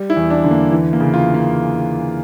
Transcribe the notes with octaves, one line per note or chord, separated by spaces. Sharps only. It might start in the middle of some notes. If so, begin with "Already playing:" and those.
Already playing: G3
E4
E2
D4
D3
A#3
E3
A#3
C#3
F4
A#3